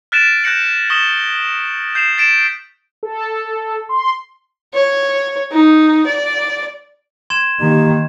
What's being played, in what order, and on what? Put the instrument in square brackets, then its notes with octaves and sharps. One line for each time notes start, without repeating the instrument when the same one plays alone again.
[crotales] F6 F#6 A6 B6 D7 E7
F#6 G6 A#6 C#7 F#7
C#6 D#6 A#6 E7 F#7 G7
G6 C7 E7 F7
A6 B6 D7 E7
[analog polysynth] A4
C6
[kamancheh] C#5
D#4
D5
[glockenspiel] C6 G#6 E7
[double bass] D#3 [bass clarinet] A#3 [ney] G4